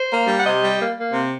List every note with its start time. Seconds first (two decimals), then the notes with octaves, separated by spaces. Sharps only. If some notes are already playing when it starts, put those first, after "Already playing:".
Already playing: C5
0.11 A#3
0.28 G3
0.37 F#5
0.45 C3 D#5
0.62 G3
0.79 A#3
0.96 A#3
1.13 C3